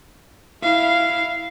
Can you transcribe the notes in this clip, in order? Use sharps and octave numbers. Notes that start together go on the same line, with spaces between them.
E4 F5